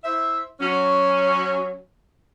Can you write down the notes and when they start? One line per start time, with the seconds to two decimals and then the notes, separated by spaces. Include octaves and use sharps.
0.04 E4 C5 E5
0.60 F#3 C#4